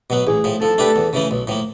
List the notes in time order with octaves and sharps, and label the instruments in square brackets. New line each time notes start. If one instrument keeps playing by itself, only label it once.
[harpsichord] B2 F#3 B3
[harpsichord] A1 [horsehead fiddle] G#4
[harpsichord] A2 F3
[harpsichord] F3 [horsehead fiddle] A4
[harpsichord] A3 D4 G4 B4
E2
C#3 E3 A3 C#4
B1
A2 F3 A#3